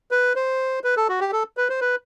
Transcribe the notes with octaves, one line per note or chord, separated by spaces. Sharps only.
B4
C5
B4
A4
F#4
G4
A4
B4
C5
B4